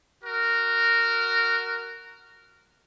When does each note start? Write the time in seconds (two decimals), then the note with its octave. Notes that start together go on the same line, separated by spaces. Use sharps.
0.23 F#4 A#4